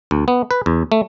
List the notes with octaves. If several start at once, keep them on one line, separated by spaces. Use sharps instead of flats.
D2
B3
B4
E2
A3